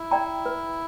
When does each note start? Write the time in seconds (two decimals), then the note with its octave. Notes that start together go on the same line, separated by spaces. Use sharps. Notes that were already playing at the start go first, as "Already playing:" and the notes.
Already playing: E4
0.11 D5 G5 A#5
0.46 B4